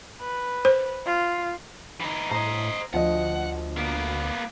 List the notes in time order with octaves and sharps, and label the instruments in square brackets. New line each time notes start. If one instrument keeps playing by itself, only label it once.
[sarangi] B4
[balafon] C5
[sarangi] F4
[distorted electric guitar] E3 D#4
[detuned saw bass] A2 [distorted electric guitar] C5 D#5 [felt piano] A#5
[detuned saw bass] D2 [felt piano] F3 D#5 [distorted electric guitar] F#5
[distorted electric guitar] A#3 B3